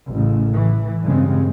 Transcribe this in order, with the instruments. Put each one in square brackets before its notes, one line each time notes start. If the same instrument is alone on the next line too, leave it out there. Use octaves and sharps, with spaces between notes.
[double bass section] A1 A2 C#3
A2 E3
G2 A#2 C#3 G#3 C4